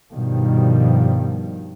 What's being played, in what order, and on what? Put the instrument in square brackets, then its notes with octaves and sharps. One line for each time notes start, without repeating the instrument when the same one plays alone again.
[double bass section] G2 B2 D#3 F3 G3